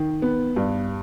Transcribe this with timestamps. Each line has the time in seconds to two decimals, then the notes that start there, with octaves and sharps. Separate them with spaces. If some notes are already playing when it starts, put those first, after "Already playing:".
Already playing: D#3
0.22 B3
0.56 G2